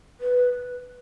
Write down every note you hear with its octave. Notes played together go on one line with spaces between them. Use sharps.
B4